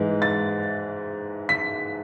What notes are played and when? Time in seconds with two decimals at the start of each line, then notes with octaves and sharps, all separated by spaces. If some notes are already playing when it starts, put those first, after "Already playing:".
Already playing: G#2 E3 G#3
0.22 A6
1.49 B6